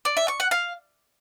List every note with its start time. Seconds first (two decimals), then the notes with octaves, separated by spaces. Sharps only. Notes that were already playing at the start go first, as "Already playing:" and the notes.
0.05 D5
0.17 E5
0.28 C#6
0.40 F#5
0.51 F5